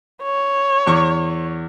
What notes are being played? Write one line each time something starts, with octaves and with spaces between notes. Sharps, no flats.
C#5
E2 C#6 D6